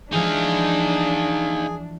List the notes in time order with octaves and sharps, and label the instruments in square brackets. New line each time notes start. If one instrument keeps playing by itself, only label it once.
[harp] E3 F3 G#3 [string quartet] D4 [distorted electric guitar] D#4 F5 [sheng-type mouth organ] G#4